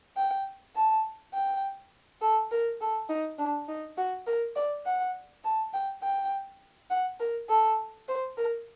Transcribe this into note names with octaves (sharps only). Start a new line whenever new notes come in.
G5
A5
G5
A4
A#4
A4
D#4
D4
D#4
F#4
A#4
D5
F#5
A5
G5
G5
F#5
A#4
A4
C5
A#4